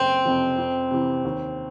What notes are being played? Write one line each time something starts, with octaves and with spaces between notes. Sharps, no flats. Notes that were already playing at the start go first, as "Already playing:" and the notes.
Already playing: F#1 C4
F2 C3 F3
F2
C3 E3
D#2